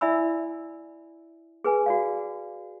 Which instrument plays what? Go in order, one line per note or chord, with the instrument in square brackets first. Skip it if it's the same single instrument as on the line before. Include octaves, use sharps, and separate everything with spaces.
[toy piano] E4 D5 E5 G#5 B5 E6
G#4 B4 G#5
F#4 D5 F5